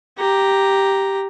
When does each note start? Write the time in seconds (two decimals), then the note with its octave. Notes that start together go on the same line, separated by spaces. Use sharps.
0.18 G4 A#5